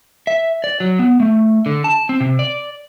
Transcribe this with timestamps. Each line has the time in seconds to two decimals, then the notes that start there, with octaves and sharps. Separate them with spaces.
0.27 E5
0.64 D5
0.80 F#3
0.99 B3
1.20 A3
1.66 D3
1.84 A5
2.09 C4
2.20 C3
2.39 D5